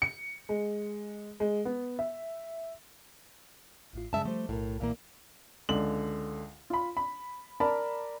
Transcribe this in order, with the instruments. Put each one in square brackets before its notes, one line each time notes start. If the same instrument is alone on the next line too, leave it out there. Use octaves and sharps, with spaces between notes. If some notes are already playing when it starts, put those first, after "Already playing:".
[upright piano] C#7
G#3
G#3
B3
E5
[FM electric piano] A1 A2 F4
[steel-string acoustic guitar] G2 E5 A5 [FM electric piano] C#3 G#3
[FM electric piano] F3 G3 C5 [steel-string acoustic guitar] A3
[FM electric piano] B1 A#4 [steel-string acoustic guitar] A2
[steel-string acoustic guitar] A#2 E3 A#3
[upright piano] C#2 D3 F#7
F4 B5
B5
A#4 D5 A5 B5